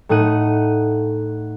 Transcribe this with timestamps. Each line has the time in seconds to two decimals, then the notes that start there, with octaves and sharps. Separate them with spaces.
0.09 A2 A3 D#4 F#5 D#7